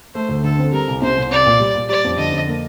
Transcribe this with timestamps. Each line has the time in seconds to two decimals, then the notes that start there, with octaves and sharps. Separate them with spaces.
0.14 A3 C5
0.29 D2
0.44 D3 A4
0.59 C4
0.72 G3 A#4
0.88 C2
1.02 C3 C5
1.17 C2
1.31 C4 D5
1.46 A#2
1.60 G3
1.75 A#2
1.89 G3 D5
2.05 F2
2.18 D3 D#5
2.32 F2
2.48 A#3